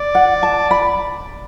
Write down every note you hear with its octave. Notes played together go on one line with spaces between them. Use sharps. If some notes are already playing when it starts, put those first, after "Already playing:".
Already playing: D5
F#5
A5
B5